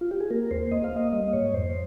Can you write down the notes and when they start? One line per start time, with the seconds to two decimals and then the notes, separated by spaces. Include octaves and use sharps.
0.01 F4
0.11 G4
0.20 G#4
0.30 A#3 A#4
0.51 D#2 C5
0.72 A#3 D#5
0.84 F5
0.92 A#3 D#5
1.13 G3 D#5
1.33 G#2 C#5
1.54 F2 C5